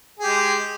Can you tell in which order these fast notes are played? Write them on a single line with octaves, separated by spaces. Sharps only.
G#4 G4 G#3